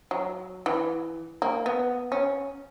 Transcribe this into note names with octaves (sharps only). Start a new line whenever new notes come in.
F#3
E3
A#3
B3
C#4